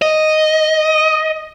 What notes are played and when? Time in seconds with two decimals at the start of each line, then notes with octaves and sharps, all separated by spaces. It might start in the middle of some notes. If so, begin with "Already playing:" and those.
0.02 D#5